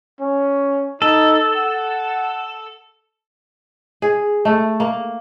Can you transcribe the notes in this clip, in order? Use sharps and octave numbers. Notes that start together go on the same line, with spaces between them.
C#4
D#4 A4
F#5
G#4
A3
A#3